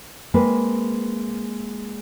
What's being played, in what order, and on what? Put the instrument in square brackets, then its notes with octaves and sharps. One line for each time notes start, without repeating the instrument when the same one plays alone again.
[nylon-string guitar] G#3 A#3 C4 B4